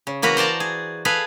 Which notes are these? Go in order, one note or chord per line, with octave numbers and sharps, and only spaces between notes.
C#3
E3 A#3 F#4 B4 A#5
C5 D5 A5 A#5
G#4
G#4 A4 B4 F5